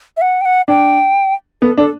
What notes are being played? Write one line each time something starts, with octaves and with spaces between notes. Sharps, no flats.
E5
F#5
G5
F#5
D4 G5
B3 A4
D4 A4